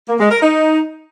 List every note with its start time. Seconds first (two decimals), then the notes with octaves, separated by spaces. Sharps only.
0.09 A#3
0.20 G#3
0.31 A#4
0.42 D#4